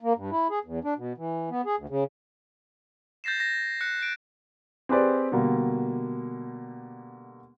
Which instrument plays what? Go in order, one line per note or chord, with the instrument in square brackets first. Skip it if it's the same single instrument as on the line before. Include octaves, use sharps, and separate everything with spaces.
[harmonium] A#3
G2
E4
G#4
E2
D4
B2
E3
B3
G#4
D2
C#3
[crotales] G6 A6 A#6 C7 E7
A#6
F#6 C#7
F#6 D7
[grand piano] C4 G4 G#4 B4 C5 D5
B2 D3 G3 A#3